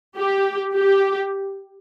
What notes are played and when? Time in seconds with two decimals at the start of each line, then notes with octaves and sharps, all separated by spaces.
0.18 G4
0.76 G4